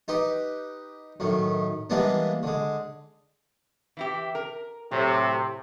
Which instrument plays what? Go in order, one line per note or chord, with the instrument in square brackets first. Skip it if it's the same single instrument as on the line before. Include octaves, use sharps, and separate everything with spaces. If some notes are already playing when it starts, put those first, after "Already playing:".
[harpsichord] D#4 G4 B4
F#2 A2 D#3
E3 G3 G#3 A#3 B3 D4
D3 G#3
[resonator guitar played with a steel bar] E3 E4 G4
A#4
[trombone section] A2 C3 [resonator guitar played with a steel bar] F#3